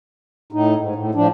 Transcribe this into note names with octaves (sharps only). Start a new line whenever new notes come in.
A2 D#4
G#2
A2
A2 F3 D4